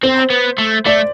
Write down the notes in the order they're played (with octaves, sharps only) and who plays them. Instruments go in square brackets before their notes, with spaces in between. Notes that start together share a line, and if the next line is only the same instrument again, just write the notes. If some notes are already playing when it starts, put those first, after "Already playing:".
[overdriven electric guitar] C4 [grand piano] C5
[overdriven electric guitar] B3
A3
[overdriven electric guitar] A3 [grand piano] D5